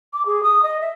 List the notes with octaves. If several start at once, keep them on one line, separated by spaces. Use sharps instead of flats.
D6
G#4
D#6
D#5
E5